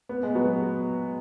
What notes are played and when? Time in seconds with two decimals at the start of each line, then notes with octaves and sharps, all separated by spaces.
0.09 B3
0.23 G#3
0.35 F#3 B3